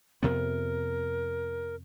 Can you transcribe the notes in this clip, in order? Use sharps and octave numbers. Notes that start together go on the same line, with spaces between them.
F2 C3 B3 A#4